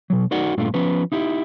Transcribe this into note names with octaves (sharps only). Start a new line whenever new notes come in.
B2 F#3
D#4 F#4 A#4 D5 F#5
G2 A#2 A3 D4 F4
F3 B3 C#4 B4
D#4 E4 G4